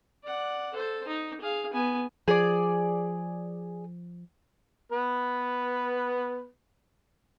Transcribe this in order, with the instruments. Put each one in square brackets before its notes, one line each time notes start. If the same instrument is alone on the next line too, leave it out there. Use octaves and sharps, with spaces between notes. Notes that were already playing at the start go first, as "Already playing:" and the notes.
[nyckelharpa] D5 F#5
A4 C5
D#4
G#4 F5
B3 G#5
[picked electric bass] F3 [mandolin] G#4 D5
[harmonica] B3 B4